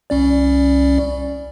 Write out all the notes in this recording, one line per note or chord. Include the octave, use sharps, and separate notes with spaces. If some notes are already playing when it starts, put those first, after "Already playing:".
C2 C#4 D5